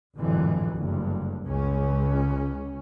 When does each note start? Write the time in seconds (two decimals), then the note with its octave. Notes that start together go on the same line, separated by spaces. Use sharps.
0.17 G#1 F2 A2 D3 E3 F#3
0.75 F#1 D2 G2
1.44 C#2 C#4